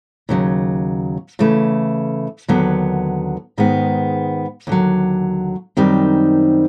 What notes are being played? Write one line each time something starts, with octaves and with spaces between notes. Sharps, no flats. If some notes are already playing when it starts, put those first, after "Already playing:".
D#2 C#3 F#3
C#3 E3 A3
D#2 D3 F#3 B3
G#2 D#3 G#3 B3
D#2 D3 F#3
F#2 D#3 G3 C4 D#4